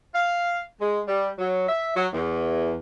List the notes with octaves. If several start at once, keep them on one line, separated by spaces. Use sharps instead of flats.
F5
G#3
G3
F#3
E5
F#3
E2